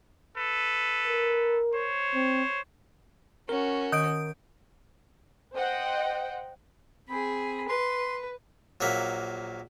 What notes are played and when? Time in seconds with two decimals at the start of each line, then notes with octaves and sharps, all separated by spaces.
0.37 A4 B4
1.08 A#4
1.73 C5 C#5
2.14 C4
3.49 C#4 F#4 A#4
3.92 D#3 D#6 G6 D7
5.54 C5 D#5 F#5 G5
7.09 C4 G#4 B5
7.69 B4 C6
8.81 A#1 F#3 A#3 E5